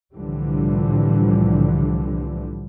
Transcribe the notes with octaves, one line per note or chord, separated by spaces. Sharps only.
C2 A2 D3 E3 F3 G3